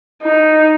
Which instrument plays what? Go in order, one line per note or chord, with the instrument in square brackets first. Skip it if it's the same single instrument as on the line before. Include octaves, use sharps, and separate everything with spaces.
[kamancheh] D#4